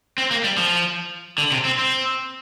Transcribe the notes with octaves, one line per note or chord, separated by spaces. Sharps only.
C4
A#3
G3
F3
D3
C3
C4
C4